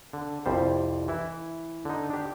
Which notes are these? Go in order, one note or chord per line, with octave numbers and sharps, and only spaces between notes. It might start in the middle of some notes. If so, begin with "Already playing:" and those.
D3
C2 F2 G3 C5
E3 E4
D3 D#4
D4 G4